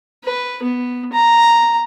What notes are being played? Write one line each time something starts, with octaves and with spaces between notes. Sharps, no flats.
B4
B3
A#5